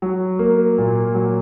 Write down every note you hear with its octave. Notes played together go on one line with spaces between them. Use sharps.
F#3
A#3
A#2
F#3